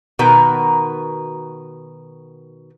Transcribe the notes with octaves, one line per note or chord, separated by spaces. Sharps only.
B2 D#3 F#4 A#4 B4